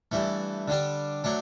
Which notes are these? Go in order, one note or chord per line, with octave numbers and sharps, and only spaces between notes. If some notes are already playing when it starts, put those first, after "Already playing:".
G2 E3 A3
D3 G3 D4
F#3 A3 D4